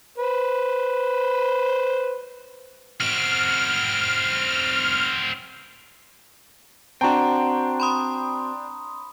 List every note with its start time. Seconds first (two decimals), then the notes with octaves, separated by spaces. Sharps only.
0.18 B4 C5
3.00 C4 F#4 F6
7.01 C4 D4 F#4 G5 A5 A#5
7.80 B5 C6 D#6